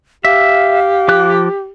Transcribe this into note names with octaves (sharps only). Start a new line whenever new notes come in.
G4 E5 F5
F3 D6 F#6